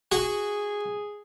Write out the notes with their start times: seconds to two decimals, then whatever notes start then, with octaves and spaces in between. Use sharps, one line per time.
0.12 F#4 G#4